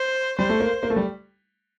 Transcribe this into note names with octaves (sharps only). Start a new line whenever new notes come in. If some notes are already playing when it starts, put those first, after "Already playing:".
Already playing: C5
G3 C5
A3
A#3
A#3
A3
G3